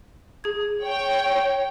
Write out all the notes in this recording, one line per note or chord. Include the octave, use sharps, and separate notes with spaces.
G#4 G#6
C#5 G5